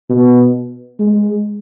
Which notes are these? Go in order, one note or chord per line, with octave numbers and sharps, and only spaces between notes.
B2
G#3